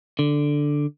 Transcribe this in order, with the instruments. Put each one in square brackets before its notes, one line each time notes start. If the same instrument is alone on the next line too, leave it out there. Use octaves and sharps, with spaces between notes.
[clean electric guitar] D3